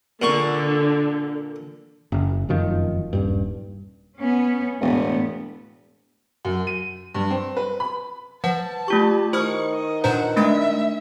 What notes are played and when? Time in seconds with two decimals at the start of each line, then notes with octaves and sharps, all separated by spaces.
0.22 A#2 D3 C#6
2.12 F#1
2.49 F1 F#2 D#3 F3
3.13 D#1 G2
4.18 B3 C#4
4.81 E1 A2 B3
6.45 F#2
6.67 D#7
7.14 G2
7.30 C4
7.57 B4
7.80 B5
8.44 F3 B4 F#5 A5
8.88 A3 F4 G4 C#6
9.33 D#3 E4 C5 C#6 D#6 F6
9.72 D#5
10.04 A#2 D4 B4 C5 F#5 A#5
10.37 G#3 A3 D4 E5 A6